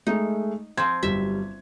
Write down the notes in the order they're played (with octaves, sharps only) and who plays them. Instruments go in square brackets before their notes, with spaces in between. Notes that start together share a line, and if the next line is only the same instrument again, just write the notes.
[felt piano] G#3 A3 [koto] D#4
[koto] F3 C4 [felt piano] G#6
[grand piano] G1 F#3 G3 [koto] E5